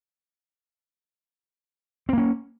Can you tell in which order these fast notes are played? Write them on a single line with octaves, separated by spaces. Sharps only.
C4 A#3 C#4